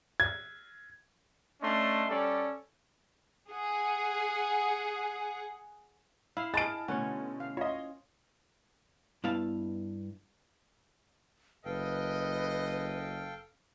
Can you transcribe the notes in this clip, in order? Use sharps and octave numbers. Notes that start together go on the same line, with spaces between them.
G#6
A3 C#4 D4 D#5 C6
G3 C#4 A4 D5
G#4 F#5
E4 F5
G#4 D#5 A5 F6 A6 D7
B2 D3 A3 C#4 C#5 F#5
F5
F4 C#5 D#5
G2 B3 E4 F5 A5
F#1 A4 B4 D#5 F5 G5